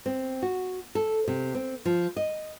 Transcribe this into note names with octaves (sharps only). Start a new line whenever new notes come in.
C4
F#4
A4
C3
C4
F3
D#5